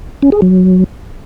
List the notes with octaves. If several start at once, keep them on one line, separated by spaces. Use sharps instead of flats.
C#4
G#4
F#3